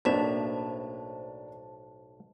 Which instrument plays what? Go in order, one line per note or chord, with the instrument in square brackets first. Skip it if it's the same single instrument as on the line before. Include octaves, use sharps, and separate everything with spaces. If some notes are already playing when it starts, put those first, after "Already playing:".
[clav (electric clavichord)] B1 A2 E5 [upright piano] A#3 D4 [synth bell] C5 A5